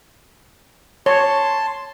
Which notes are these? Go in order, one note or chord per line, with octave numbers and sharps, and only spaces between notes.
C#5 A5 C6